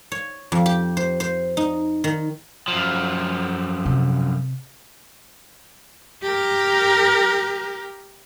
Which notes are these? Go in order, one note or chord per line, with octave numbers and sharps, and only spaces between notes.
C#5
F2
G4
C5
C5
D#4
D#3
F#2 F3
C3
G4 A#4